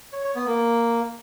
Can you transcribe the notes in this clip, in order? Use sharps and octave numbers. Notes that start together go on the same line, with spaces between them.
C#5
C#5
B3
A#3